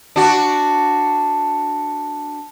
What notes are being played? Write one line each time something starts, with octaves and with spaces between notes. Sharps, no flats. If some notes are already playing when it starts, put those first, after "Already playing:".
D4 F#4